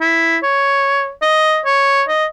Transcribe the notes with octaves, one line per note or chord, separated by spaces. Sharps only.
E4
C#5
D#5
C#5
D#5